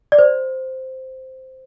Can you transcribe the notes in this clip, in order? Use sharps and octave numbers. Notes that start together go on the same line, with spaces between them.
D5
C5